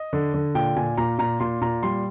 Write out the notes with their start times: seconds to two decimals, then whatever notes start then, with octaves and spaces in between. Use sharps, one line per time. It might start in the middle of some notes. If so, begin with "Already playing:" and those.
Already playing: D#5
0.13 D3
0.34 D3
0.55 A#2 G5
0.76 A#2 G#5
0.97 A#2 A#5
1.18 A#2 A#5
1.40 A#2 C6
1.61 A#2 A#5
1.83 G3 C6